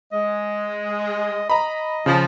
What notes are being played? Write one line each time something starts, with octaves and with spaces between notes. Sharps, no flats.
G#3 D#5
D#5 A#5 B5
C#3 F3